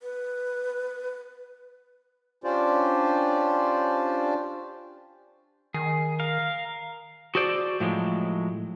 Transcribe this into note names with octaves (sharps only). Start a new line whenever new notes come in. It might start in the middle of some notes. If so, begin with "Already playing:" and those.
B4
C#4 D4 F4 G4 C5 D5
D#3 G#4
A#4 F5
F#4 G#4 A4 C5 D5
A2 F3 F#3 G#3